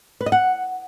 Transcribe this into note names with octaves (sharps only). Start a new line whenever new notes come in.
B4
D#5
F#5